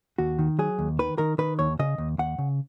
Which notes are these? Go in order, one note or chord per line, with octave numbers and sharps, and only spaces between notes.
D#2 F#4
D#3
F#3 G#4
D#2
D#3 B4
D#3 A#4
D#3 B4
D#2 C#5
C#3 D#5
D#2
D#2 F#5
C#3